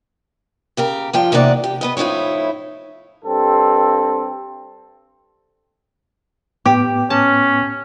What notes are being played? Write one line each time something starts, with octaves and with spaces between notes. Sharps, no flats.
C#3 G4 A#4
G2 F3 F4 G5
E2 C3 A#3 D#4 D5 F#5
G4
B3 B4 D#5
A2 F3 D#4 E4 C#5
G2 C4 A4
A2 B3 G4 D6
C#4 A5